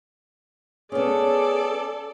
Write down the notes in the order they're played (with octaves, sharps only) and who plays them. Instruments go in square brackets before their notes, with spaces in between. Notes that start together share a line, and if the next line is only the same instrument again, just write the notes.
[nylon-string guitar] B3 C#4 [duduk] G#4 [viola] A4 D5